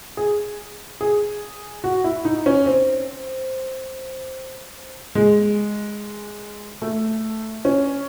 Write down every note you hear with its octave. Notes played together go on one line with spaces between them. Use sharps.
G#4
G#4
F#4
E4
D#4
C#4
C4
G#3
A3
C#4